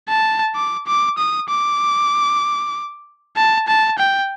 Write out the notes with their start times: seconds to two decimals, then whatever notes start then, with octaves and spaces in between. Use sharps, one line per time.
0.08 A5
0.55 D6
0.87 D6
1.18 D#6
1.49 D6
3.36 A5
3.68 A5
3.99 G5